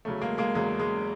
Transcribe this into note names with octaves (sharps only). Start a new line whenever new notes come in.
E2 C#3 F#3 A3
G#3 A#3
G#3 A#3
E2 C#3 F#3 G#3
G#3